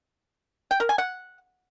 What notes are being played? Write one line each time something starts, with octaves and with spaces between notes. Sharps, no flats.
G5
A#4
G#5
F#5